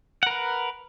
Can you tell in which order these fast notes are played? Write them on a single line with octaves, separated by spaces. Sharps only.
F#5 A#4 B4